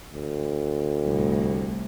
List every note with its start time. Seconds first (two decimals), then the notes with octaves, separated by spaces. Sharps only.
0.12 D2
1.05 C2 A2